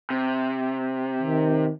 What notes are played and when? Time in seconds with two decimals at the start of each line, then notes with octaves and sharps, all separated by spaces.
0.10 C3
1.21 D#3